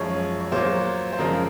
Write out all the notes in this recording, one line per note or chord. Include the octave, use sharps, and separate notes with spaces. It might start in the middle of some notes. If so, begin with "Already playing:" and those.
Already playing: F#2 F3 G#3 C#5
C#5
A#2 F#3 C5
C5
F#2 C#3 F3 G#3 A#4